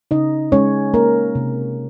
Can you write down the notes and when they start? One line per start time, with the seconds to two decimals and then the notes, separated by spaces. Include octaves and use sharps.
0.11 C#3 D#4 D#5
0.52 G#3 C#4 C#5
0.94 A#3 A#4
1.35 C3